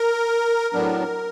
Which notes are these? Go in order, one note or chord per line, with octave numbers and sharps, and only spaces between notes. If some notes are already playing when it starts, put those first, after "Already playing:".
Already playing: A#4
A2 F#3 B3 D4